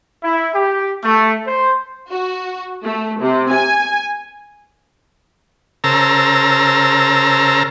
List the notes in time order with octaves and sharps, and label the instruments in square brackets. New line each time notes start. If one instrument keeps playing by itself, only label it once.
[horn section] E4
G4
A3
C5
[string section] F#4
A3
C3
G#5
[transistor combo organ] C#3 A#4 C5 A5 A#5 E6